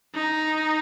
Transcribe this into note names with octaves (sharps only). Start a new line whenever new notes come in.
D#4